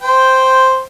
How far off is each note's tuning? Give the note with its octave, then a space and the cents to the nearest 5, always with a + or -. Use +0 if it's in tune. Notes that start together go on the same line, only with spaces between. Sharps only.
C5 +0 G5 +0